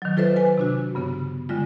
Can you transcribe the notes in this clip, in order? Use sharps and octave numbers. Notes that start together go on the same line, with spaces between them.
D#3 F#3
F4 A4 B4 C5 E5
B4 G#5
C3 D4 F#4
G2 C#3 B3
D3 G3 G#3 F4